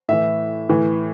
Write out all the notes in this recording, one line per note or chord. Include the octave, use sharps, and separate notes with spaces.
A2 E3 E5
A2 E3